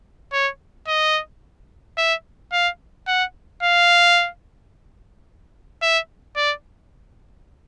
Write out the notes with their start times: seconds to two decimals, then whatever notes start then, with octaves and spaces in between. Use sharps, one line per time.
0.33 C#5
0.87 D#5
1.98 E5
2.52 F5
3.07 F#5
3.63 F5
5.82 E5
6.36 D5